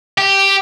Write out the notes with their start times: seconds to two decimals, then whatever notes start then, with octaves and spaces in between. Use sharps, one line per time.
0.18 G4